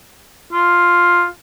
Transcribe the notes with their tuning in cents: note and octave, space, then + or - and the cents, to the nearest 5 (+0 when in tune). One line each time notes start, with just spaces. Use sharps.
F4 +5